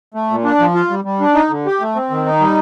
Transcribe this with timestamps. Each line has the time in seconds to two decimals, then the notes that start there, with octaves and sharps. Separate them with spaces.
0.14 A3
0.30 A#2
0.44 D4
0.60 F3
0.75 F4
0.90 G3
1.04 G3
1.20 D4
1.35 D#4
1.50 D3
1.66 G4
1.80 A3
1.95 C4
2.10 D#3
2.26 D#4
2.40 G3